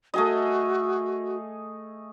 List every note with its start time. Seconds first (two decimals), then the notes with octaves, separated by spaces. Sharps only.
0.14 A3 F#4 G#4 D#5